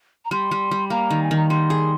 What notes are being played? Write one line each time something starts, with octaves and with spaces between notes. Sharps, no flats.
A#5
G3 C6
G3
G3
A#3 A#5
D#3
G#5
D#3
A#5
G3 C6
G#4